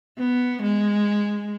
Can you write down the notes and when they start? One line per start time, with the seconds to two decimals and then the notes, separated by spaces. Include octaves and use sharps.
0.18 B3
0.62 G#3